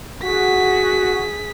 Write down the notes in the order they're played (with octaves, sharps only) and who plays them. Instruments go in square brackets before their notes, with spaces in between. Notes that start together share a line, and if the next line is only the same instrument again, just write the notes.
[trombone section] F#4 [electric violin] G#4 B6